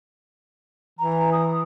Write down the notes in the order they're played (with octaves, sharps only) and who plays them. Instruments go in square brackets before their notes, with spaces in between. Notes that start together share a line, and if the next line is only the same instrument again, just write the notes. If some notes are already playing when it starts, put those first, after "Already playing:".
[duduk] E3 [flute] A#5
[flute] D#6